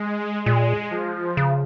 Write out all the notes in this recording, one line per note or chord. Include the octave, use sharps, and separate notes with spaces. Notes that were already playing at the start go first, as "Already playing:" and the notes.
Already playing: G#3
A#2 G#3
F3
C#3